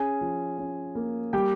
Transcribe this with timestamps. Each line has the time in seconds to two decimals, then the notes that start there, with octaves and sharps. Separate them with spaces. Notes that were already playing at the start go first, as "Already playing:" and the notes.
Already playing: C#4 G#4 G#5
0.21 F3
0.58 C#4
0.95 A#3
1.33 G3 G4 G5